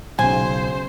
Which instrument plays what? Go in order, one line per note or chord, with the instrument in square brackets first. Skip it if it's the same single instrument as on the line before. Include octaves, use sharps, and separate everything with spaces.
[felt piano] B1 C#3 [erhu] C5 [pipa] G#5